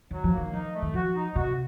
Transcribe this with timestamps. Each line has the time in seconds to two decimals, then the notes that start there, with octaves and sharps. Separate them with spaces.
0.11 D#3 F#3
0.24 F3
0.32 A#3
0.37 D#3
0.53 F3 D#4
0.74 A3
0.82 D#3
0.94 F3 F#4
1.15 D#4
1.36 C3 F#4